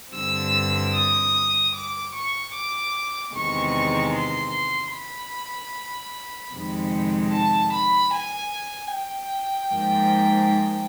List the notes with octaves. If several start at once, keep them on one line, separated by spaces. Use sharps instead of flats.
G2 D3 G3 C4 E6
D#6
D6
C#6
D6
E2 C3 D#3 G#3 C#6
C6
B5
F2 C3 D#3 G#3
A5
B5
G#5
G5
G#2 F3 A#3